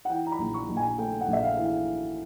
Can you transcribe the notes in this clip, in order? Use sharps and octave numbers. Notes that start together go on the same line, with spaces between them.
F#5
E3 G5
A#5
B5
A#1
C#6
A#1
G#5
A3 G5
F#5
A#1
E5
F5
E3
F5